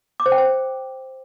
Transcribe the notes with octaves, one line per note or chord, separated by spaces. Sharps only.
D6
C5
G5
C5